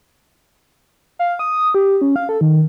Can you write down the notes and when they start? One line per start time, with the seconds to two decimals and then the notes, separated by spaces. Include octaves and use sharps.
1.19 F5
1.39 D#6
1.75 G4
2.02 C#4
2.16 F5
2.29 A4
2.41 D#3